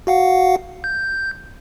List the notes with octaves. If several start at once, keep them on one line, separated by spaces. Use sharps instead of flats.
F#4 F5 F#5
G6